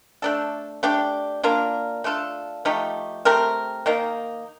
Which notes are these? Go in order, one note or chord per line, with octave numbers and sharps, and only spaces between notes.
A3 D4 A4
A3 D4 G4
A#3 D4 F4 A#4
A3 D4 F4 A4
F3 A3 D#4 G4
A3 C4 G4 A#4
D#3 A#3 D#4